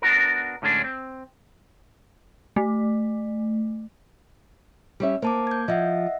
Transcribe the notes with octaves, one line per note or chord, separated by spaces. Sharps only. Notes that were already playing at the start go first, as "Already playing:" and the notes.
B3 D4 F4 F#4 A#4
A2 D3 G#3 C#4 D4
C4
A3
G3 C#4 E5
A#3 C5 A5 D6
G6 G#6
F3 D#5 E5 F#5